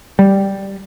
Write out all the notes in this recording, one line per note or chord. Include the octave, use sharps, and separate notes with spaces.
G3